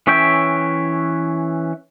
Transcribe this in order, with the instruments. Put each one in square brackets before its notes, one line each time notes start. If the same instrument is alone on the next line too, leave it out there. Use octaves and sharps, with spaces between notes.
[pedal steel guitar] E3 C#4 C#5 E5 G5